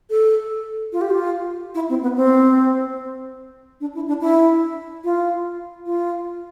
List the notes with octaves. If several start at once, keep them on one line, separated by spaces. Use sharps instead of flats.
A4
F4
G4
F4
E4
C4
B3
C4
D4
E4
D4
E4
F4
F4